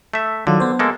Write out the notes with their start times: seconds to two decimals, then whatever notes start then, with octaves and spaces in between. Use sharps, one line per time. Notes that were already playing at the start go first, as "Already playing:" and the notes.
0.14 A3 E5
0.47 D3 D#3 F#3 F4
0.60 B3 C5
0.79 G#3 A#3 A4